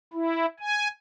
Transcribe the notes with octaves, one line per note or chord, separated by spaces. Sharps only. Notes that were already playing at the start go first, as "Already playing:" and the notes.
E4
G#5